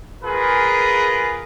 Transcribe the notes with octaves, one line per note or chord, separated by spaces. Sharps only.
F4 G#4 A#4 B4